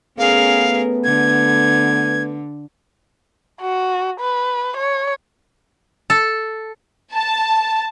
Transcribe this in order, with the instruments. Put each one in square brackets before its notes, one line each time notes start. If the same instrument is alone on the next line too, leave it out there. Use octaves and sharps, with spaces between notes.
[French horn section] A3 B3 [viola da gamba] C#4 G#4 A#4 [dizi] F5
[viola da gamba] D3 [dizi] G#6
[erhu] F#4
B4
C#5
[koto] A4
[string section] A5